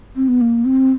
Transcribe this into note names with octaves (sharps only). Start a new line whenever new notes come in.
C4
B3
A#3
C4